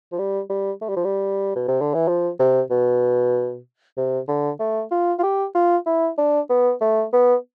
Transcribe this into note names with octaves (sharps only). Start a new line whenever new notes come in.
F3
G3
G3
A3
G3
F3
G3
B2
C3
D3
E3
F3
C3
B2
C3
D3
A3
F4
F4
G4
F4
E4
D4
B3
A3
B3